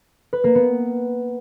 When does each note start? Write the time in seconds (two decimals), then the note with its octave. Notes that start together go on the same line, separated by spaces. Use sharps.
0.33 B4
0.44 A#3
0.55 B3